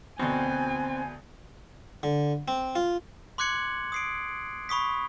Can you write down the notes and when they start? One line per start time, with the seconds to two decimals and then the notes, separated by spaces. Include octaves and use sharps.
0.19 D2 B2 C4 G#5
2.03 D3
2.48 C4
2.75 F4
3.38 C6 D6 F#6 G#6 C#7 F#7
3.92 D#6 C7 D7
4.69 B5 C#6 D#6 B6